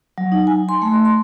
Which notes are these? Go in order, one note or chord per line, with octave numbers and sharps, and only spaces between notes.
F#3
D#4
G#5
C6
A3
C6